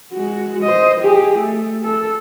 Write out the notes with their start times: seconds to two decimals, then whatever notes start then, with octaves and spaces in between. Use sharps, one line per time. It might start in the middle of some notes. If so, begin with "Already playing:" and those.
0.13 G#3 F#4
0.64 C5 D#5
1.00 G4 G#4
1.38 A3
1.84 A4